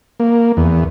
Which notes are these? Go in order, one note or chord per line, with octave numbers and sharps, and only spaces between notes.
A#3
E2